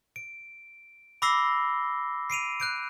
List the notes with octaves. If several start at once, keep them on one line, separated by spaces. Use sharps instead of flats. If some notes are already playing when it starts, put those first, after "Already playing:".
D7
B5 D6 E6 A#6 C7 G7
C7 D7 D#7 F7
F#6 G6 D7